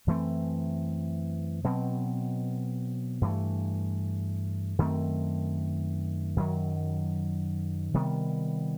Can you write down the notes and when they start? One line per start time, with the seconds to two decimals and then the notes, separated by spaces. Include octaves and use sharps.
0.07 F#2 E3 A3 C4
1.64 B2 F#3 C4
3.21 G2 E3 A3
4.79 F#2 D#3 A3 C4
6.36 F#2 D#3 F#3
7.94 C3 D#3 G3 B3